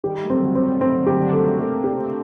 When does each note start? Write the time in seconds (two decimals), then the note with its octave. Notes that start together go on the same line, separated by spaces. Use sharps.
0.03 D#3 G3 G4
0.23 F#3 A3
0.30 C4
0.42 D3 F#3
0.55 C4
0.62 D#3 G3
0.81 F#3 A3 C4
1.00 G3 A#3
1.07 G4
1.19 D4 F#4
1.33 A3
1.39 A#3 D4
1.53 C4
1.58 A3 A#3 D4
1.77 A#3 D4
1.84 G4
1.96 A3 C4